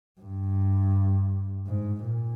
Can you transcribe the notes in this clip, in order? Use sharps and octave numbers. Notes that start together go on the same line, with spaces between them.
G2
G#2
A#2